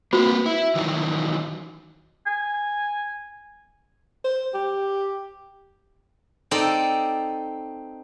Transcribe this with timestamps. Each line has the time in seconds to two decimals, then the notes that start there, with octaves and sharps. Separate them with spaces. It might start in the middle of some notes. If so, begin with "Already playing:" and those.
0.13 A#3 C4 F#4 B4 C5 B5
0.46 E4
0.75 D#3 E3 F#3
2.26 G#5
4.25 C5
4.54 G4
6.51 C4 D#4 A4 D5